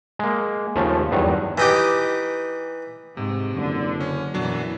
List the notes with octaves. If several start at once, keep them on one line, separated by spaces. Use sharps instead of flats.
G#3 A#3
D#2 C#3 F3 A3
E2 G2 D#3 F#3
E3 D#4 G4
G#2 C3
F#1 D3
C#4
F#2 B2 E3 F#3 D4